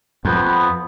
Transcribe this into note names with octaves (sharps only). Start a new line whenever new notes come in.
F2 B3